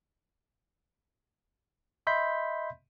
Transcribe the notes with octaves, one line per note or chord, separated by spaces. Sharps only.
D#5 E5 B5 C6 G6 B6